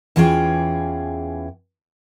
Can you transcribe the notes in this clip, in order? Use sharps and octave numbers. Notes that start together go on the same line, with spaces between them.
E2 E3 C#4 F4 G#4 G5